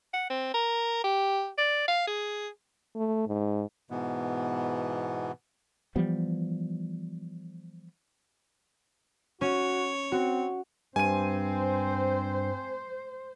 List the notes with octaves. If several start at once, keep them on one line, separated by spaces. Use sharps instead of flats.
F#5
C4
A#4
G4
D5
F5
G#4
A3
G#2
G#2 B2 E3 B3
E3 F3 G3 B3
C#4 F#4 C#5
C4 F#4
G2 C4 C5 G#5 D#7